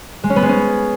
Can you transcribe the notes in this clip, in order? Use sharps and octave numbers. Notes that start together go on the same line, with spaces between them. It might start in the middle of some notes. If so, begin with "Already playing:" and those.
G#3
C#4
B3
G#3
C#4